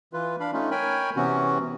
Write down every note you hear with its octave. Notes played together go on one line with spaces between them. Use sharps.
E3 F4 B4
D4 F5 B5
A3 C#4 D#4 F4
A#4 C#5 G5 G#5 B5
C3 E3 B3 C#4 F#4